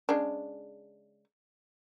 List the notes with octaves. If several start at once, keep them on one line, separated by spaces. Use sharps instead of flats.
C#3 G#3 D4